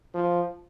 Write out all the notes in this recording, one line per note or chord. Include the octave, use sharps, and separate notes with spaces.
F3